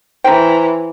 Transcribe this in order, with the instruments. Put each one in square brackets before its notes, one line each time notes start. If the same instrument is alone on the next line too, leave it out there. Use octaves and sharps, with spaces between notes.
[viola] E3 [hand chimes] C5 A#5 [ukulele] G5